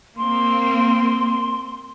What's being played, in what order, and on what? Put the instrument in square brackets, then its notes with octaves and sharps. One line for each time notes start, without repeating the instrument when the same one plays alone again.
[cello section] A#3 C4 [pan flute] C6